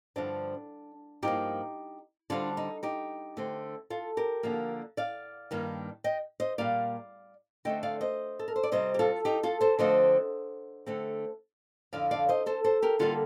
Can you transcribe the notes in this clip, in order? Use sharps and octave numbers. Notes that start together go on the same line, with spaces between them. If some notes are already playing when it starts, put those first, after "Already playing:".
G2 D3 F3 C4 D4
G2 F3 A#3 D#4 G4
D3 G3 C4 D4 F4
D#4
D#4 G4
D3 A3 C4
F4 A4
G4 A#4
D3 F3 A#3
D5 F5
G2 D#3 G3 A#3
D#5 G5
C5 D#5
A#2 G3 A#3 D5 F5
D3 A3 C4 D#5 G5
D5 F5
C5 D#5
A4
A#4
C5
D5
C3 G3 C4 C5 D#5
G4
F4 A4
D#4 G4
F4 A4
A4 C5
D3 F3 A3 C4 C5 D#5
D3 A3 C4
F2 D3 F3 D5 F5
D5 F5
C5 D#5
A4 C5
A4 C5
G4 A#4
D3 G3 A#3 F4 A4